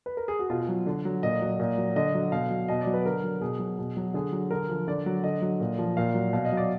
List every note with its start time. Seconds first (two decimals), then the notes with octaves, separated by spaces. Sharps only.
0.06 B4
0.17 A#4
0.28 G#4
0.39 F#4
0.50 B2 F4
0.69 F#3
0.86 D3
1.05 F#3
1.23 A#2 D#5
1.42 F#3
1.60 A#2
1.78 F#3
1.96 D3 D#5
2.15 F#3
2.32 B2 F5
2.50 F#3
2.68 B2 D#5
2.81 D5
2.86 F#3
2.94 B4
3.05 D3 A#4
3.24 F#3
3.41 B2 G#4
3.59 F#3
3.79 B2
3.97 F#3
4.14 D3 G#4
4.32 F#3
4.51 D3 A#4
4.69 F3
4.88 D3 D5
5.06 F#3
5.24 D3 D#5
5.42 F#3
5.60 A#2
5.79 F3
5.97 A#2 F5
6.15 F#3
6.33 B2 F5
6.45 D#5
6.52 F#3
6.57 D5